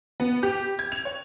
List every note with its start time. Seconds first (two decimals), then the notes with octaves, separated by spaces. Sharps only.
0.20 B3
0.43 G4
0.79 G#6
0.92 F7
1.05 C#5